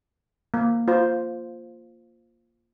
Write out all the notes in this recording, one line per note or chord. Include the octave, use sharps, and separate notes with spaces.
A#3
F4 C5